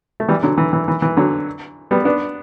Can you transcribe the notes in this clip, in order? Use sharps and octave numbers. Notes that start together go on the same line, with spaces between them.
A3
E3 G3
D3 F#3
E3
E3
E3
E3
D3 F#3
G3 B3
B3 D4